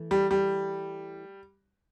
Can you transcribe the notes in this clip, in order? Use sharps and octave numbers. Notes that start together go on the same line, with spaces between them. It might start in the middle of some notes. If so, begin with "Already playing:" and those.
Already playing: E3 A3 E4
G3
G3